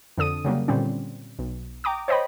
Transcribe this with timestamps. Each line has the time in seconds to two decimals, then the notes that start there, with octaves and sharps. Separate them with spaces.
0.18 F2 D3 A4 D#6 D#7
0.45 C#3 F#3 G3 A#3
0.68 A#2 D3 G3 C4 C#4
1.39 B1
1.84 G5 A#5 D6 D#6
2.08 C5 C#5 D#5 G5 B5